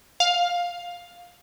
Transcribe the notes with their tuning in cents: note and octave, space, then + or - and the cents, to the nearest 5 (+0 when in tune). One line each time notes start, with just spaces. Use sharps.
F5 +10